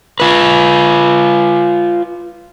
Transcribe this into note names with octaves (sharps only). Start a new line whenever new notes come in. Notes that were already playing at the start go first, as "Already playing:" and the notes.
F4 B4